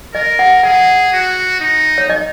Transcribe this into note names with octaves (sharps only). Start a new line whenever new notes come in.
A#4 D#5
F#5
G#4 F#5
F#4
D#4
C#5
D#5